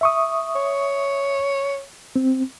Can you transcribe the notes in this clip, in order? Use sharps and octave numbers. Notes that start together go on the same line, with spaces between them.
E5 C#6 D#6
C#5
C4